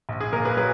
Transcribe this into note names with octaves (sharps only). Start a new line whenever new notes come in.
A#1
G#4
A#2 A#4
G#4 B4
F#3 G#4 B4